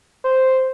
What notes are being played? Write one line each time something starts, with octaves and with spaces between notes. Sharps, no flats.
C5